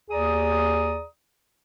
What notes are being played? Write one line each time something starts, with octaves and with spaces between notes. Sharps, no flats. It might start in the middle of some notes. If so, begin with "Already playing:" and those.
D#2 G#4 D5 A#5 D#6